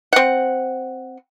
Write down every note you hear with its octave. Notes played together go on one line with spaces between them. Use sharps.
C4 F#5